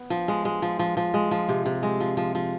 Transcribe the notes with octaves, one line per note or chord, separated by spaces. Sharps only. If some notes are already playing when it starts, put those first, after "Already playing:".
Already playing: B3
F3
G#3
G#3
F3
F3
F3
G#3
F3
C3
C3
G#3
F3
F3
F3